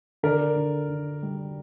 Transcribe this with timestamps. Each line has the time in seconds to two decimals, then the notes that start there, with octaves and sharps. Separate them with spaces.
0.23 D3 A#4 D5
0.56 D3
0.89 D3
1.22 G3